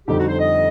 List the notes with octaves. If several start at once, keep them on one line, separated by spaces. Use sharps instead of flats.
F2 D3 G3 C4 D#4 G4
F#4
C5
D#5